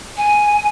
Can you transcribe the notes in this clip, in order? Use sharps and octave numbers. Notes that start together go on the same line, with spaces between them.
G#5